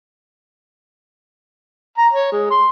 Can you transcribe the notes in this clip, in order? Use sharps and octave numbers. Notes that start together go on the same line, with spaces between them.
A#5
C#5
G#3
C6